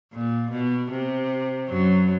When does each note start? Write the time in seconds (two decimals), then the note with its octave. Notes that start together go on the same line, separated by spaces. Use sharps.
0.13 A#2
0.51 B2
0.91 C3
1.69 F#2 F#3